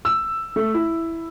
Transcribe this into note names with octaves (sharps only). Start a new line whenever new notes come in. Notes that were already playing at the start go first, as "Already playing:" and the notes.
E6
A3
E4